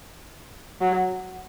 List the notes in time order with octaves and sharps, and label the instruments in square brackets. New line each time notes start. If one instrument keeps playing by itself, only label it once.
[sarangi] F#3